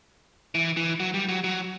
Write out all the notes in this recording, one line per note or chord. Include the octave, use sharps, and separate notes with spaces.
E3
E3
F#3
G3
F#3
F#3